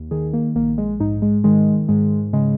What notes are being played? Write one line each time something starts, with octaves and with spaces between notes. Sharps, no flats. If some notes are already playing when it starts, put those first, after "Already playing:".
Already playing: D#2
D#3 G#4
A#3
A#1 A#3
G#3
G#2 D#4
G#3
D#3 G#3
G#2 G#3
C#3 G#3